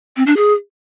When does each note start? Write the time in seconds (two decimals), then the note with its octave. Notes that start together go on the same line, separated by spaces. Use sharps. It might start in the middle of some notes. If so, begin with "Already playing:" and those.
0.17 C4
0.27 D4
0.37 G#4